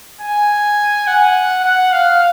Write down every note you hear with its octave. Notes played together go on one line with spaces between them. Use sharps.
G#5
F#5
F#5
F5